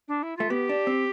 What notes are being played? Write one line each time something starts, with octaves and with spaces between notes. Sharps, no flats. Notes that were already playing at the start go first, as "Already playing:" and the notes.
D4
E4
A3 F4
B3 G4
D4
C4